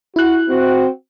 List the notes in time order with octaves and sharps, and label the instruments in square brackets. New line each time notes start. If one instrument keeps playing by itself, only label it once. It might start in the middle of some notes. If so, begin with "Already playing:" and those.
[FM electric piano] E4 F#6 [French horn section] F#4
[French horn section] C4 F#4